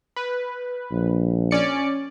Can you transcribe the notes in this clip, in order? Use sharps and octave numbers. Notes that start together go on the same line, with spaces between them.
B4
A#1
C#4 D5 C#7